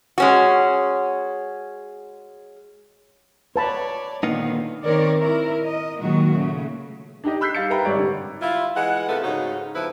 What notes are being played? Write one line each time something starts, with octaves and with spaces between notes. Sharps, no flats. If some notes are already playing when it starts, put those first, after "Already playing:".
G#3 C#4 F#4
B4 C#5 D5 A5 B5
A#2 D3 D#3 A#3 B3 D#4
D#3 C4 A#4 C#5 D5
E4 A#4
D#5
A#2 D#3 F#3 G#3 F#4
C#3 A3
D4 D#4 G4 D#5
B5 E6 F#6 G6 B6 C7
G3 F5 A6 C#7
A#4 B4 E5 G5 A#5 B5
G#1 G3 C#5 D5 D7
D3
E4 F4
E3 G#3 F#5
C3 A3 B3 F4 A4
G#2 C#3 D#4 F#4
F2 F3 E4 B4